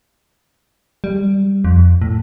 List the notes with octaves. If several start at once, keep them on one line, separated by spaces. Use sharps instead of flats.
G3
F2
A2